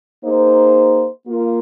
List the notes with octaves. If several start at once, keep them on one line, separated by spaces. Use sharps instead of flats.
A#3 D#4 G#4 C5
A#3 F4 A#4